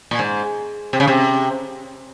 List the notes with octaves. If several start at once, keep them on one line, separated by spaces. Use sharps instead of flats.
A#2
G#2
C3
C#3
C3